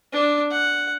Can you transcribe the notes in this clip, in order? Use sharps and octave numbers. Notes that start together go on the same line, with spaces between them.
D4
F#5